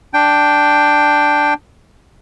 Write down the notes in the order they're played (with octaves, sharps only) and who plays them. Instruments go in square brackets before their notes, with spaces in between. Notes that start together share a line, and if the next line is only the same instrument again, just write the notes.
[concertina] D4 G5